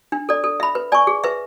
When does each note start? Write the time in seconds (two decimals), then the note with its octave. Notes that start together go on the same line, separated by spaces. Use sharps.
0.12 D4
0.29 A4 D5
0.44 A4
0.60 E5 B5
0.75 B4
0.92 D5 G#5 C#6
1.07 G#4
1.24 B4 E5